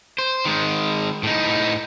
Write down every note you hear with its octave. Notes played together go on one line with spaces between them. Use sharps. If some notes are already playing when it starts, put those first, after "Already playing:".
C5
D#3 G#3
A2 D#4